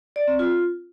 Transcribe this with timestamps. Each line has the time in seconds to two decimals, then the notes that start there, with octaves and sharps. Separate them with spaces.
0.16 D5
0.28 C4
0.39 F4